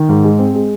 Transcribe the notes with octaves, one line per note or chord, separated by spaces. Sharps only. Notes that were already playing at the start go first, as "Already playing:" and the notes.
Already playing: D#3
G#2
G#3
C4
G#3